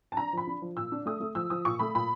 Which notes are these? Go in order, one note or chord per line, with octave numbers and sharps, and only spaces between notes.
A5
D4 A#5
F3 B5
D4
F3
A#2 E6
D4
A3 D#6
A3
F3 E6
F3 D#6
A#2 C#6
A3 B5
A#2 B5